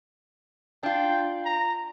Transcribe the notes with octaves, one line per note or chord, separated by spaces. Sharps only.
D4 F4 G5
A#5